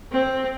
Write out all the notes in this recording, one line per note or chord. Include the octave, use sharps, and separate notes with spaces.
C4